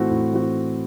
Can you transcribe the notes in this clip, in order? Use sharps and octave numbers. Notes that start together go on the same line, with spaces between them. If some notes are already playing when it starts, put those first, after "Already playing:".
Already playing: A2 E3 A3 C4 F#4
A2
E3 A3 C4 F#4